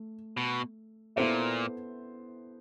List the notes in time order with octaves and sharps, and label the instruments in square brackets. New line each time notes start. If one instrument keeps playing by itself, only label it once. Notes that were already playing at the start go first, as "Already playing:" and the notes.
Already playing: [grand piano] A3
[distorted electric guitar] B2
[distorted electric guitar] A#2 [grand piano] B3 E4 A4 C5 E5